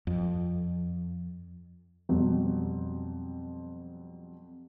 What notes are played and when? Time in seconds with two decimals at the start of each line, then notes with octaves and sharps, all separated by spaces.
0.07 F2
2.09 F2 B2 F#3 G3